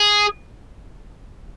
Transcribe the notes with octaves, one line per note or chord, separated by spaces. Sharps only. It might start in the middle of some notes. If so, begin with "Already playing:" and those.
Already playing: G#4